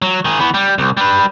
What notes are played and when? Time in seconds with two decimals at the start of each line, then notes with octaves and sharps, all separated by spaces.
0.02 F#3
0.25 D#3 G#4
0.40 E3 B3
0.54 G3
0.78 C2
0.97 G3 B4